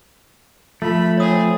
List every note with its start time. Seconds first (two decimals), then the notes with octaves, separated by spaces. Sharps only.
0.82 F3 A3 B5
1.17 C4 G#4 C#5 D#6